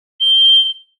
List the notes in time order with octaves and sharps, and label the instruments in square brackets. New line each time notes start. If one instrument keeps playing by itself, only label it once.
[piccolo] G7